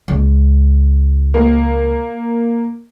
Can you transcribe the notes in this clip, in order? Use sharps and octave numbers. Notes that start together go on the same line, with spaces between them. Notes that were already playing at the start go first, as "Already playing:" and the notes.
C#2
A#3